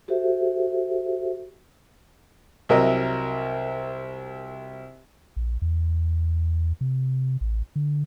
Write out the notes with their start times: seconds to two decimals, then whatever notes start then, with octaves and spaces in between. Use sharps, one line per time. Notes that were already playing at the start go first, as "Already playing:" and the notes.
0.08 F#4 G4 A4 C5 E5
2.69 C2 F#3 A#4 D#5 E5
5.36 A#1
5.62 E2
6.81 C3
7.41 A1
7.76 D3